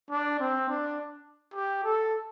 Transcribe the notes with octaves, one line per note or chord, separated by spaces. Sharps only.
D4
C4
D4
G4
A4